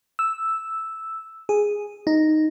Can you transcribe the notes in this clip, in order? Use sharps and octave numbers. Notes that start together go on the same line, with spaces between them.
E6
G#4
D#4